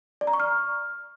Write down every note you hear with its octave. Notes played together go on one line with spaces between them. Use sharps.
D5
A#5
C#6
F6